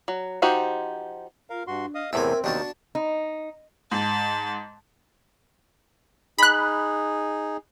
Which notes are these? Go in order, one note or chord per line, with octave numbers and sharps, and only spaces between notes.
F#3
F3 D#4 F#4 G4 C5
F4 A#4 F5
G2 D4 F#4 C6
D#5 F5 D#6
E2 A2 C3 C4 A#4 E5 G#5
D#2 D#3 B3 D4 F#4 A5
D#4
G#2 A5
D#4 G#4 B5 F#6